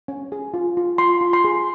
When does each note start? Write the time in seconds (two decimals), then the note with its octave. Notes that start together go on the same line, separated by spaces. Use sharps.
0.08 C#4
0.32 G#4
0.54 F4
0.77 F4
0.98 F4 C6
1.21 F4
1.33 C6
1.45 G#4